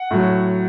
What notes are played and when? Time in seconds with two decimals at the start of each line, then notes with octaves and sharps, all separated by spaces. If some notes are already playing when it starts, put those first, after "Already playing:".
Already playing: F#5
0.11 A2 F#3